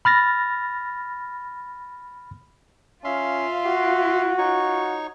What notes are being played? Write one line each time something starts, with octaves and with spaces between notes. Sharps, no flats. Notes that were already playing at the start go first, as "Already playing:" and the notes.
B5 F6 A6 A#6
C#4 F4 E5 F5 C6
F#4
D#4 C#5 C#6